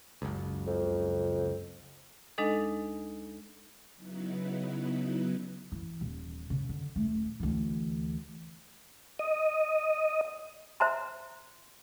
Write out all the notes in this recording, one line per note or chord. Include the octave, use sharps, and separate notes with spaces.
F#1 C#2
F2
D2 G#3 D4 D#4 A4 D#5
C#3 F#3 B3 D#4 E4 B4
E3
D#1
C#3
D3
D#1 A3
D2 E3
D#5
C5 E5 A#5 C6